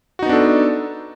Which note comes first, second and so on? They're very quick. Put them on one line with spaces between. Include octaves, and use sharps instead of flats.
F#4 D#4 B3 D4 A4